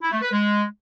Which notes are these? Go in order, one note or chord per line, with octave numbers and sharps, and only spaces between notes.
E4
A3
B4
G#3